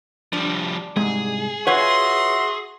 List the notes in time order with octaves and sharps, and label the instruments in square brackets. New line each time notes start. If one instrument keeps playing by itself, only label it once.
[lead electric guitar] F3 G3 [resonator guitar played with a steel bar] D4
[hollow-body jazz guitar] C2 G#2 G#3 [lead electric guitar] G#4
[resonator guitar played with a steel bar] F4 F#5 [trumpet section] F#4 E5 C6 [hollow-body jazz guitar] B4 C#5